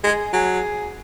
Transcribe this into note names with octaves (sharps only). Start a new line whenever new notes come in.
G#3 G#4
F#3 G#4